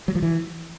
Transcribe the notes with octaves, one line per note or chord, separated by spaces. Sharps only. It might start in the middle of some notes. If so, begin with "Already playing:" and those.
F#3
F3
E3